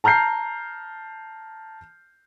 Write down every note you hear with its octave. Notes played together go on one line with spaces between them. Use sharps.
A5 A#5 F6 G6 C7